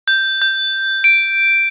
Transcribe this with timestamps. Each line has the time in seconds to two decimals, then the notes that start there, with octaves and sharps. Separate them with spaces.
0.08 G6
0.42 G6
1.04 D7